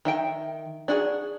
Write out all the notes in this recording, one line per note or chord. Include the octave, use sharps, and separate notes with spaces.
D#3 E5 G5
D4 D#4 F#4 G#4